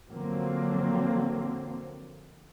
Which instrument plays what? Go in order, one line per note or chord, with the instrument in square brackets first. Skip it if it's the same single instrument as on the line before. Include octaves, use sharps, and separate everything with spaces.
[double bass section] D3 F3 F#3 A#3 C4